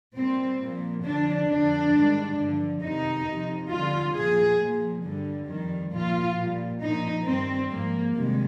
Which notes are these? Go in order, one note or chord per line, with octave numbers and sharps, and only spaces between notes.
A#2 G3 C4
A#2 F3
F2 D3 F3 D4
F2 D3 F3 D4
G#2 D#3 G3
G2 D3 F3
F2 C3 D#3 D#4
F2 C3 F3
F2 D3 G3 F4
A#2 F3 G#4
A#2 F3
G2 D3 G3
F2 D#3 G3
A#2 F3 F4
A#2 G3
A#2 F3 D#4
G2 D#3 G3 C4
G#2 F3 A#3
F2 C3 D#3 G3 G#3